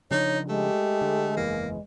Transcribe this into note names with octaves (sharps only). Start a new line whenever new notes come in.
C#3 F3 D4 D#4 C#5
G#3 A3 G4
D3
F#1 E2 E3 A#3